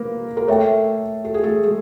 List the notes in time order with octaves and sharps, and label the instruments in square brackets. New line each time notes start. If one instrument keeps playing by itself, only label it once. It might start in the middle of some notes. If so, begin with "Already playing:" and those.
Already playing: [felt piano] A#3 A#4 B4
A#4
[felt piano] A3 A4 [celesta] C#5 E5 G5
[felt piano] A4
G#4
A3 A4
G#3 G#4